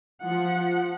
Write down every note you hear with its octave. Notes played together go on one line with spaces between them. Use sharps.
F3 F#5